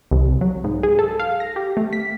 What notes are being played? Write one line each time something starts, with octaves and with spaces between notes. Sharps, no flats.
C2
F#3
G#2
G#4
A4
F5
A#6
G4
A3
B6